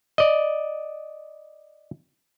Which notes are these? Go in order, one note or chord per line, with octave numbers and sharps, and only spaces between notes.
D5 D#5